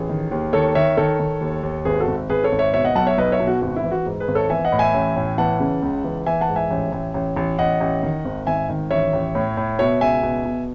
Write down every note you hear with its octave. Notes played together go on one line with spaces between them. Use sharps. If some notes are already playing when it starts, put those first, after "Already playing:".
Already playing: A1 G#4 B4
D#3
D#2
D#3 A4 C#5
D#3 C#5 E5
D#3 A4 C#5
D#3
D#2
D#2
G#1 G#4 B4
F#4 A4
G#1
G#1 G#4 B4
A4 C#5
G#1
C#5 E5
B2 C#5 E5
D#5 F#5
B1 F#5 A5
C#5 E5
B1 B4 D#5
C#5 E5
B2
F#4
G#1 F#4
E4
E3
F#4
G#2
G#4 B4
G#1
A4 C#5
E3 E5 G#5
D#5 F#5
A2
E5 G#5
A1
A2
E3 F#5 A5
C#3
C#2
E3
E3 E5 G#5
F#5 A5
G#2
E5 G#5
A1
A1
A1
A1
A1 D#5 F#5
A1
D#3
G#1
G#1 E5 G#5
D#3
A1 C#5 E5
A1
A2
A2
B2 C#5 E5
C#2 E5 G#5
B2
B2